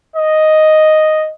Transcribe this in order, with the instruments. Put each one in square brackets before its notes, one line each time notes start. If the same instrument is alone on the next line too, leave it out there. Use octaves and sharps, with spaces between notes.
[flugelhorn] D#5